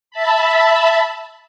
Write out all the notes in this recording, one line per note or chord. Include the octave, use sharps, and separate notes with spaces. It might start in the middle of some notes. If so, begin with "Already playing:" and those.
E5 A5 B5